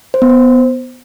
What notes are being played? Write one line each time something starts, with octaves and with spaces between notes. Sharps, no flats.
C5
B3
C5